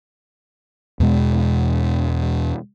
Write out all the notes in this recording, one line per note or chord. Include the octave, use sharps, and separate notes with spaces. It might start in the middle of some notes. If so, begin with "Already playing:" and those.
E2 B2 G#3